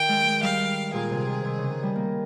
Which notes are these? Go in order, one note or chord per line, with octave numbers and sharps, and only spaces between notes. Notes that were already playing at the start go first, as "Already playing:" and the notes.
Already playing: D#3 G5
G#3
G#3
G3 F5
A#2 G#4
C3
D#3
C3
C#3
D#3
G3
A#3